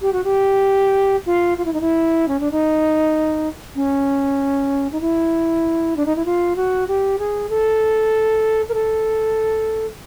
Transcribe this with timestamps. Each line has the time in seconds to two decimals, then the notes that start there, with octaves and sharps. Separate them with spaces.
0.02 G4
0.13 F#4
0.24 G4
1.26 F4
1.58 F4
1.65 E4
1.74 D#4
1.81 E4
2.28 C#4
2.40 D4
2.52 D#4
3.76 C#4
4.92 D#4
5.01 E4
5.97 D4
6.06 D#4
6.16 E4
6.25 F4
6.56 F#4
6.88 G4
7.19 G#4
7.50 A4
8.69 A#4
8.74 A4